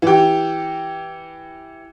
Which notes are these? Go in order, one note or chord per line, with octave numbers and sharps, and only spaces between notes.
E3 G4